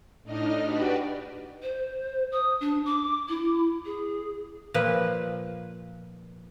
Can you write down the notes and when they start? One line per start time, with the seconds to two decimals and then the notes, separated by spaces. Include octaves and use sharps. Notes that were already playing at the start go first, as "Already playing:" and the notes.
0.24 A2 D4 D#4 D#5 F6
0.63 D4 F#4 G4 B4 D5
1.63 C5
2.32 D#6
2.61 D4
2.85 D6
3.29 E4
3.85 G#4
4.74 A#2 F3 B4